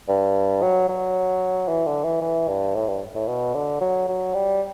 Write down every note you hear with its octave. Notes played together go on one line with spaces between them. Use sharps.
G2
F#3
F#3
E3
D3
E3
E3
G2
A2
G2
A2
B2
D3
F#3
F#3
G3